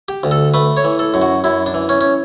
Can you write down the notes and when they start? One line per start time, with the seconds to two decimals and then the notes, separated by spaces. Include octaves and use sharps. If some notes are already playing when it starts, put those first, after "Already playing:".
0.09 G4
0.24 D2
0.31 A4
0.54 A3 B4
0.77 C#5
0.84 E3
0.99 A4
1.14 F#2
1.22 F#4
1.44 F#2 E4
1.66 D4
1.74 E3
1.89 C#4
2.01 C#4